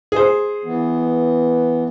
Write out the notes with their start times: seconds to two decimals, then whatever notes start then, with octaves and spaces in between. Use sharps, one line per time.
0.12 G#4 C5
0.65 E3 B3